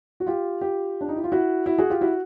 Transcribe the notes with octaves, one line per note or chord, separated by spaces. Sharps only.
F#4
F4 G4
F4 G4
D4
D#4
E4
F4
E4 F#4
E4 F#4
F#4 G#4
F4 G4
E4 F#4